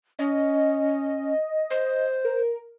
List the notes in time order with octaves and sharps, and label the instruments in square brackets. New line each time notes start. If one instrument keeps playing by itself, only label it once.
[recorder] C#4 [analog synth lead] D#5
[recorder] C5
[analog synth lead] A#4